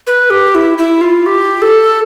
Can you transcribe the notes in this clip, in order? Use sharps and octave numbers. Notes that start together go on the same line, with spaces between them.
B4
G4
E4
E4
F4
G4
A4